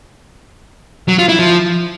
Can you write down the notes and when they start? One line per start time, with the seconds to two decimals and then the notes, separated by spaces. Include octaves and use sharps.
1.08 F#3
1.18 F4
1.29 E4
1.39 F3